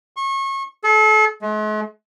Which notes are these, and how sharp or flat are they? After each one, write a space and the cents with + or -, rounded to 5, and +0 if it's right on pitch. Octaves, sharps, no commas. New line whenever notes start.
C#6 -30
A4 -35
G#3 +45